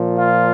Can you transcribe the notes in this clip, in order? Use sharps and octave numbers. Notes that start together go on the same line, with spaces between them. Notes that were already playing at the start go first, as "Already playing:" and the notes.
Already playing: A#2 F3
F4